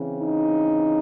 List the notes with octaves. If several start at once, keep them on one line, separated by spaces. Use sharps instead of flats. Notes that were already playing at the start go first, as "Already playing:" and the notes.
Already playing: C#3 E3 C4
D#4